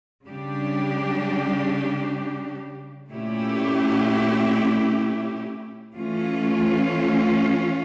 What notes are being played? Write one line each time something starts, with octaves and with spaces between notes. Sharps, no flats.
C#3 G3 D4 G4
A#2 A3 C#4 E4 G4
E3 A3 C#4 F4